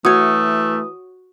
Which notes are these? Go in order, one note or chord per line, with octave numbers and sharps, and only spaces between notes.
E3 A3 F#4 C#5 D#6